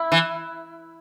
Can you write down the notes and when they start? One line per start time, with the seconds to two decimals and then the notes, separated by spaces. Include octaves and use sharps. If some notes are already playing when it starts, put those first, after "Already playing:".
Already playing: E4
0.12 E3